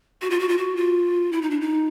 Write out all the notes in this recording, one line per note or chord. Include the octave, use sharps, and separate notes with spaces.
F#4
F4
F#4
F4
F#4
F4
E4
D#4
D4
D#4